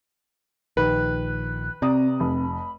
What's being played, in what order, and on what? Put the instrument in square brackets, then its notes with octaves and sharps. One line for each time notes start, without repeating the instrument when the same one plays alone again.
[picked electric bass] A#1 [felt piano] D#3 [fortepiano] B4 [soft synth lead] F#6
[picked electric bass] C3 [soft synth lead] C4 [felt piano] D5 A#5 D#6
[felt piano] F1 [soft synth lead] B5